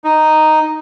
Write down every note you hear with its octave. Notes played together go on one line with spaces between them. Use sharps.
D#4